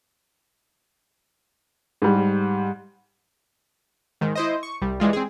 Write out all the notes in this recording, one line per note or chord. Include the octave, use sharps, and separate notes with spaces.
G#2 G3
G#2 D#3
E4 C5 D#5
C#6
C2 G3
E3 G3 G#3 F4
C4 G#4